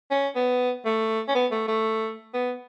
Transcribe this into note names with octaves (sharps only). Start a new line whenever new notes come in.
C#4
B3
A3
C#4
B3
A3
A3
B3